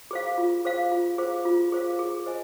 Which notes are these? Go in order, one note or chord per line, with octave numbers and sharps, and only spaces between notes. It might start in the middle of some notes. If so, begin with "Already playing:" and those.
G#4 C5 F5
F4
G#4 C5 F5
F4
G#4 C5 F5
F4
G#4 C5 F5
G#4
C5 D#5 G#5